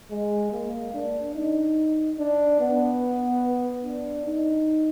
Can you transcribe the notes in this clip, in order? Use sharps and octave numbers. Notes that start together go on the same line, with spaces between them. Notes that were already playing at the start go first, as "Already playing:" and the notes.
G#3
A#3
D4
D#4
D4
B3
D4
D#4